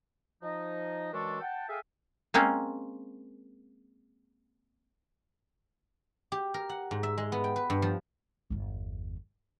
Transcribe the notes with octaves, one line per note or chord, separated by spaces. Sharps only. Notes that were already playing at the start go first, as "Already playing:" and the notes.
F3 D#4 D#5
F#2 E3 G#3 D4 A4 C#6
F#5 G5 A5
G#4 A4 E5 F5 G5 G#5
G#3 A#3 C4 C#4
G4
A#4
F#5
G#2
E5
G#3
B3
G5
B4
G2
F3
G1 E2